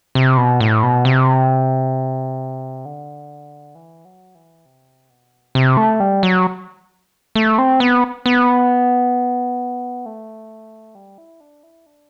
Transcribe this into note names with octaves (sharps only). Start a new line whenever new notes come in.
C3
B2
A2
B2
C3
D3
E3
F#3
E3
C3
B2
C3
A3
G3
F#3
A3
C4
B3
B3
A3
G3
E4
D4
E4
D4